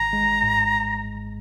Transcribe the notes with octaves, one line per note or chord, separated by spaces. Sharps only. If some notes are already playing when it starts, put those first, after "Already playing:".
Already playing: G#1 A#5
G#3
G#2